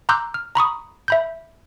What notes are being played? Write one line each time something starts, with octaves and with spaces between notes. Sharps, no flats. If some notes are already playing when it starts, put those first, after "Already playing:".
A#5 C6 D6 E6 F#6 G6
F6
A#5 B5 C#6 D#6
E5 B5 G6